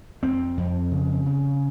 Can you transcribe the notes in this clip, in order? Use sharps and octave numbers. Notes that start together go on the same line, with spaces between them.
F2 C4
F2
C#3
C#3